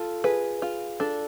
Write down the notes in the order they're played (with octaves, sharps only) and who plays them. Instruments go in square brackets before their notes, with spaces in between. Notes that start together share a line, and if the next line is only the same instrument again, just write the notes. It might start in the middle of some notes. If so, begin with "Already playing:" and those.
Already playing: [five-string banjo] F4 [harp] A4
[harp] G#4 [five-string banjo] B4
[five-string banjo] F4
[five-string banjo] D4 [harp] A4